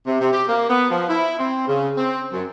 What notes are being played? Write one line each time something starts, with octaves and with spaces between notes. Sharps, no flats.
C3
C3
G4
A#3
B3
F3
E4
C4
C#3
C4
F#2